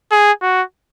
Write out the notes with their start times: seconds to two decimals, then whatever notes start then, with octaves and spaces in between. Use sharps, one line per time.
0.12 G#4
0.42 F#4